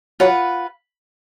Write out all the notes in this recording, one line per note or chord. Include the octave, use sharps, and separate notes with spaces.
F#3 F4 B4 F#5 B5